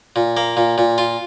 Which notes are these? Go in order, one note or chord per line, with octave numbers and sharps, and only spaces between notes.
A#2
A#3
A#2
A#2
F4